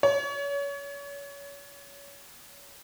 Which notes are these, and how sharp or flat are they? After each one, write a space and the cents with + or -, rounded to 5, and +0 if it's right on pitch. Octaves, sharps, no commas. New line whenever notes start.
C#5 +30